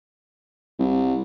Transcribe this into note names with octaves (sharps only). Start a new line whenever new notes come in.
C2